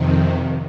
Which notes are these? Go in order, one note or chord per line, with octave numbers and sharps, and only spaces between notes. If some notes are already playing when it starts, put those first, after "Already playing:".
Already playing: F2 C3 D#3